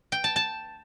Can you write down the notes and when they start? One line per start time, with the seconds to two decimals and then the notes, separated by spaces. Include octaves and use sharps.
0.12 G5
0.24 A5
0.36 A5